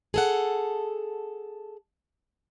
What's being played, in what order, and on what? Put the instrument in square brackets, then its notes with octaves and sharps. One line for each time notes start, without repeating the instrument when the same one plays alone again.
[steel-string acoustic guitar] G#4 A4 F#5